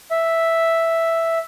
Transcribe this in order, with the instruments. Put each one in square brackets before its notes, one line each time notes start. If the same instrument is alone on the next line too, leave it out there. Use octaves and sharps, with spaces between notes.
[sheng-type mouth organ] E5